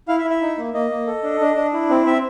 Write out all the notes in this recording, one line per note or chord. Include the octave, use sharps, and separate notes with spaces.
E4 F5
E5
E4
E5
D#4
A#3
A#3 D#5
A#3
A4
D4
D4
D4
E4
C4
C4 E5